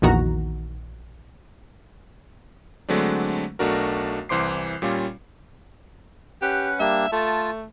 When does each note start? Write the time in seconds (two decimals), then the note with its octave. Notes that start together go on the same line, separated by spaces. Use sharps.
0.02 A#1 E2 D#3 F#4 A#5
2.89 D3 F#3 G#3 A3 C4 D4
3.59 B1 A3 D4 F#4 A#4
4.29 C2 E3 C5 C6 D6 C7
4.82 A#2 G3 C#4 F4
6.42 C#4 G4 B4 F#5
6.80 G3 A#3 D4 E5
7.12 A3 F4 A5